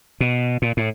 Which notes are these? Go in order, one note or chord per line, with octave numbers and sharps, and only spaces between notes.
B2
A#2
A2